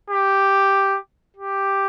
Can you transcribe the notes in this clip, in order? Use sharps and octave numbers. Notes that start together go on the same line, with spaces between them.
G4
G4